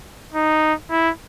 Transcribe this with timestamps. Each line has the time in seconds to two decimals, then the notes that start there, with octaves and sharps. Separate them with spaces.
0.35 D#4
0.91 E4